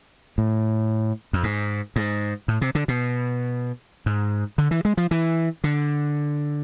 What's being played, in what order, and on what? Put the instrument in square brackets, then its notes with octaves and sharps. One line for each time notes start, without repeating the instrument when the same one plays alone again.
[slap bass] A2
F2
G#2
G#2
A2
C3
D3
B2
G#2
D3
E3
G#3
F3
E3
D3